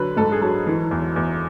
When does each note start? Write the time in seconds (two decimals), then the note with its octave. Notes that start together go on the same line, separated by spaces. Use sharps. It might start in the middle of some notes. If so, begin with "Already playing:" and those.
Already playing: D3 F#3 B4
0.16 G#2 A4
0.32 G#4
0.41 F#3 A4
0.67 E3
0.91 E2
1.16 E2